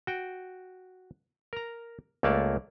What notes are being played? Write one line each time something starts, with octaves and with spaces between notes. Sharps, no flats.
F#4 G5
A#4 A#5
C#2 A3 A#3 C#5 D5 A5